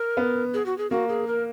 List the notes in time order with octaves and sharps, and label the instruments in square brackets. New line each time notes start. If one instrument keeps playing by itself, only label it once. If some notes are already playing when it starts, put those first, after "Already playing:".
Already playing: [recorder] A#4
[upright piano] B3
[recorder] G#4
F#4
G#4
[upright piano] A#3 [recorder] F#4
[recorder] G#4
A#4